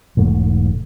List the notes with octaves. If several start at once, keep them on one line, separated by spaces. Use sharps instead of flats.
E1 G#2 A3